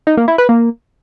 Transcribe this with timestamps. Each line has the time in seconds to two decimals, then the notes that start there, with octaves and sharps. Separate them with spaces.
0.07 D#4
0.17 A#3
0.28 E4
0.38 B4
0.49 A#3